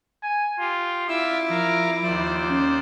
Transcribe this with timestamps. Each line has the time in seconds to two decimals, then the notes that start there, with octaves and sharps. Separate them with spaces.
0.23 G#5
0.60 F4 G4
1.09 E4 F4 E5 D6 E6
1.50 F3 A#4 F5 A#5
2.03 D#2 F3 C5 D5
2.50 C#4